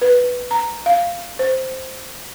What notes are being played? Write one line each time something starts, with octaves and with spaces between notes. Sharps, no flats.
B4
A#5
F5
C5